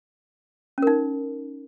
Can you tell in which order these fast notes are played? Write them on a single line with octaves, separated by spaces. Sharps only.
C#4 A#4 D#4